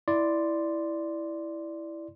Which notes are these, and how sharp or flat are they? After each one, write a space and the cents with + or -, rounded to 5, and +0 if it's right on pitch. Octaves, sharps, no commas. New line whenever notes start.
E4 +0 D5 +0 C6 -5